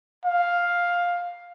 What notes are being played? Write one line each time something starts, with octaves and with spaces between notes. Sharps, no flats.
F5